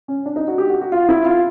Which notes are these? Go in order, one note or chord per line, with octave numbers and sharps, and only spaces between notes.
C#4
D4
D#4
F#4
G4
F#4
F#4
F4
E4
F4